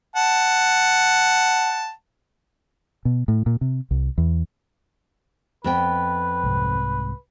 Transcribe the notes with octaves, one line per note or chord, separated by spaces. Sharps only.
F#5 A5
B2
A2
A#2
C3
C2
E2
F2 B3 B4 G5
C2 G#2 C3